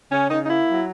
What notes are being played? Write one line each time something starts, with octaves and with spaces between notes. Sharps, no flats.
C#3 C#4
C#3 D#4
D#4
A#3 E4
F#3